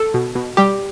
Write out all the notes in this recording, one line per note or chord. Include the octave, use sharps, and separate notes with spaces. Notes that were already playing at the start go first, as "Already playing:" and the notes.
Already playing: A4
B2
B2
G3 G4